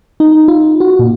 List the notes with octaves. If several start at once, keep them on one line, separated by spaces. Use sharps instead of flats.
D#4
F4
F#4
A#2